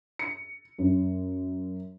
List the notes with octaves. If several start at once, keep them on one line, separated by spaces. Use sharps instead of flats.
C#7
F#2